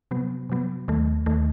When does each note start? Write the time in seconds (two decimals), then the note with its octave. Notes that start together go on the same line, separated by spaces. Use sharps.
0.11 C3 F#3 B3
0.49 C3 F#3 B3
0.88 D#2 D#3 A3
1.26 D#2 D#3 A3